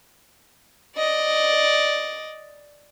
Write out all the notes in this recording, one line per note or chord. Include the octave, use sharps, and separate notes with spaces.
D5 D#5